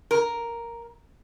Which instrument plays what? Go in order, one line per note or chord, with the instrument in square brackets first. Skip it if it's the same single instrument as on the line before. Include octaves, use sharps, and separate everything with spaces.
[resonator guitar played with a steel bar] A#4